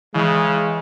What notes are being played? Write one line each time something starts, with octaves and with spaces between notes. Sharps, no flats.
C#3 E3 G#3 G5